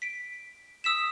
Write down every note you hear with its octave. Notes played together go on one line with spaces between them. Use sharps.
B6 D7
D#6 E6 B6 E7